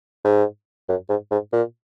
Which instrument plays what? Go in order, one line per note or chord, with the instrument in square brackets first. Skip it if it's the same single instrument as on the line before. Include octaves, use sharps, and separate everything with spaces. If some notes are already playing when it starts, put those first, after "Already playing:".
[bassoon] G#2
F#2
G#2
G#2
A#2